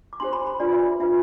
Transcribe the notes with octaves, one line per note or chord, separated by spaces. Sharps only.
D6
D4 G4 C5 C6
B5
B5
D4 F4 B4 D5
E5
D4 F4 B4 E5